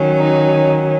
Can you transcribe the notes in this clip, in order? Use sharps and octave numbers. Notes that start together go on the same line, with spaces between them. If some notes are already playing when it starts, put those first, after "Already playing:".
Already playing: D#3 F#3 C#4
D#4